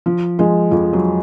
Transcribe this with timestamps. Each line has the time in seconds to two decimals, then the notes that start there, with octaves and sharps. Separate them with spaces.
0.06 F3
0.39 F3 G#3
0.71 F2 F3
0.93 F#3